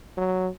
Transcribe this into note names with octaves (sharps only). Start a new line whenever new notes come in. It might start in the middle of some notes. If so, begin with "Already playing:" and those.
F#3